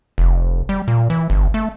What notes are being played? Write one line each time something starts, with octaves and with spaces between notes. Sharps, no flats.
F1
G3
A#2
E3
G1
A3